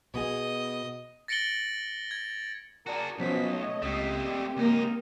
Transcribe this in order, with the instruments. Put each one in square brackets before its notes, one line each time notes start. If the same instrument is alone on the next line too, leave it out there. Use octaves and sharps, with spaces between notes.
[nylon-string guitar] B2 B3 G#4 [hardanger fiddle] D#5
[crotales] A6 A#6 C#7 D7 F#7 G7
G#6
[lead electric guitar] F#4 G#4 [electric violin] A#4 [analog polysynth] D5 A5
[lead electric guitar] B1 [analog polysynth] F3 F#3 B3 [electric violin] C#4 B6 [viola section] D#5
[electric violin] A3 [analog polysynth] C#5
[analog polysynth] C#2 B6 [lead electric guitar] A3 A#3 [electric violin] C4 G4
[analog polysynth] D5
[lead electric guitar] C#2 D#4 [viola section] A#3 [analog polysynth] D#6